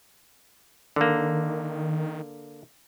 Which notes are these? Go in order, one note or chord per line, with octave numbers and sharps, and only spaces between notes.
D3 D#3 A#3